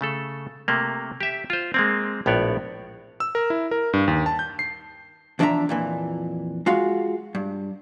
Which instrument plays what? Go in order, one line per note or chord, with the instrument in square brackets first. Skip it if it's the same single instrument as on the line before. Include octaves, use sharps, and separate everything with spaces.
[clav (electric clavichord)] C#3 A3 A4
C3 A3 A#3
G4 E5
F4 C5
G#3 A#3 C4
A#1 A2 B3 C#5 D5
[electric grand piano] E6
A#4
E4
A#4
G2
D#2
A5
G6
C7
[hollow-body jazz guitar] E2 F3 D4 A4 E5 A#5
F2 A#2 E3
G#3 F4 F#4 F5
G2